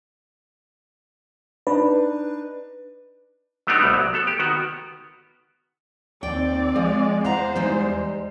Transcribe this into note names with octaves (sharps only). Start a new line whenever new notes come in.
D4 D#4 B4
F#3 A3 B3 D4 D#4 G4
C2 G3 A3 B3
F#3
B3 A4
G4
D#3 B3 F#4
D#2 C4 D5 G5
F3 G#3
E2 C5 F5 F#5 A#5
G3 G#3 D#4